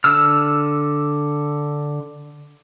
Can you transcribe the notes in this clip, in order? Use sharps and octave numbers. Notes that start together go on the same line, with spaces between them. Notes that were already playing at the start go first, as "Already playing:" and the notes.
D3 E6 F6